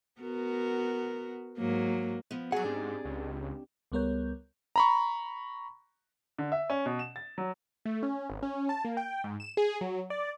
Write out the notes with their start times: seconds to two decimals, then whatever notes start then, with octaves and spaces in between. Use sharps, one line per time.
0.21 B3 F#4 A#4
1.58 G#2 F#3 A#3
2.31 F3 B3
2.52 F#3 G#4 D5 F#5
2.65 G#2 C4 D4 G4
3.04 C#2
3.92 C#2 G3 B3 A#4 C#5 G6
4.76 A#5 B5 C#6
6.38 D3
6.52 E5
6.70 C#4
6.86 B2
6.99 E7
7.16 A6
7.38 F#3
7.85 A3
8.03 C#4
8.30 G#1
8.43 C#4
8.69 A5
8.85 A#3
8.97 G5
9.24 G#2
9.40 E7
9.57 G#4
9.81 F#3
10.10 D5